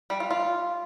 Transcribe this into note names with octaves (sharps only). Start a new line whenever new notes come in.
G3
F4
F4